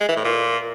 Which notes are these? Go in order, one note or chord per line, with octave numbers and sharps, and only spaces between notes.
G#3
E3
A2
A#2